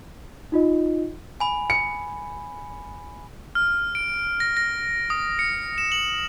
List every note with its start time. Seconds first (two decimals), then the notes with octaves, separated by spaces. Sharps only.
0.52 D#4 F4 D#5
1.40 G#5 B5
1.70 C#7
3.55 F6
3.95 D7
4.40 A#6
4.57 A#6
5.10 D#6
5.39 C#7
5.78 E7
5.92 F#7